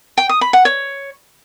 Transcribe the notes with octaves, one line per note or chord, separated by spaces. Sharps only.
G5
D#6
B5
F#5
C#5